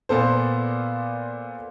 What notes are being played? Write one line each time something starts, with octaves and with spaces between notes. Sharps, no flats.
A#2 B3 A4 C5